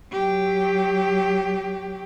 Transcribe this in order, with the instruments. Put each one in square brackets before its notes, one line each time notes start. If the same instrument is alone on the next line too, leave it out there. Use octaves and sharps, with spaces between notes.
[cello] F#3 G4